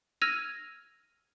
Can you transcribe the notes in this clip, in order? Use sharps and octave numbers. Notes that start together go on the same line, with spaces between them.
E6 F6 G#6 A#6 D#7 F7